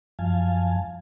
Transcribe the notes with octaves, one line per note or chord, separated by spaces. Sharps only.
F#2 F3 F5 G#5 A5